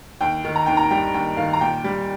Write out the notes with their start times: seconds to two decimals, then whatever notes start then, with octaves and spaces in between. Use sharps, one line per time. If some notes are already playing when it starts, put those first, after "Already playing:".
0.21 D#2 G5
0.45 D#3
0.56 A#5
0.66 D#2 G5
0.77 A#5
0.91 G3 G5
1.14 D#2 G5
1.37 D#3 F5
1.53 A#5
1.61 A#2 G5
1.84 G3